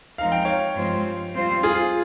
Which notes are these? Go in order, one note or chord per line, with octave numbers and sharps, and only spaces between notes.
F3 G#3 C4 D#4 A#4 F5
G5
C#5 F5
G2 F3 G#3 C4 F4
G3 C4 F4 C5
F4 G#4